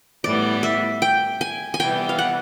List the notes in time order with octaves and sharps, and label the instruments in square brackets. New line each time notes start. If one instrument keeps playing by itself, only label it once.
[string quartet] A2 E3 G3 B3 [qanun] D5
[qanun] E5
G5
G#5
G#5
[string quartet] C3 E3 G3 B3 [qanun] G5
[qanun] F5
F#5